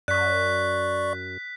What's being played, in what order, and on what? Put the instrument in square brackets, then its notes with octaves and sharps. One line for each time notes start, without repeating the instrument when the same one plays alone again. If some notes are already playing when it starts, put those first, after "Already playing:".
[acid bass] F#2 [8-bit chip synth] D5 C#6 [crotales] F#6 B6